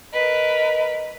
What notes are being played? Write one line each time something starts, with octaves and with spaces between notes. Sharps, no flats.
A#4 B4 D#5